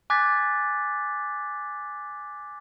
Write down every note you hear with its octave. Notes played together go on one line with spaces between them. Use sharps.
G#5 D6 F#6 G#6 A6 B6